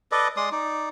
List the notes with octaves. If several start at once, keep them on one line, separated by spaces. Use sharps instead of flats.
A4 B4 D5 D#5
G#3 D5 C6 D#6
D#4 D5